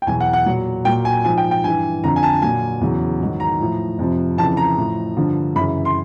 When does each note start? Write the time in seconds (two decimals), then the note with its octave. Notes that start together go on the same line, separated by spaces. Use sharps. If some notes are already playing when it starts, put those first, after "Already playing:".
0.02 G5
0.07 E2 B2 F#3 G#5
0.21 F#5
0.33 F#5
0.46 A#2 F#3
0.85 A#2 F#3 G5
1.05 G#5
1.24 G#2 F3 G#5
1.38 G5
1.51 G5
1.64 G2 E3 G#5
2.03 F2 D3 F3 A#5
2.16 G#5
2.23 A5
2.42 A#2 F#3 G#5
2.81 E2 C#3 F#3
3.21 G#2 D#3 F#3
3.40 A#5
3.60 A2 F3
3.99 F2 C3 F3
4.38 F2 C#3 E3 A5
4.57 A#5
4.77 A2 F3
5.17 G2 D3 F3
5.55 F#2 C#3 E3 B5
5.85 C6